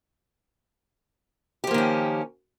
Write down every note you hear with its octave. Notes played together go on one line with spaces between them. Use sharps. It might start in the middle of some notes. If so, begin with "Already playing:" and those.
D#3 F3 A#3 C#4 G4